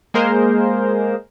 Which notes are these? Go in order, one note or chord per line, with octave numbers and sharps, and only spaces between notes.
G#3 A#3 G#4 A#4 C5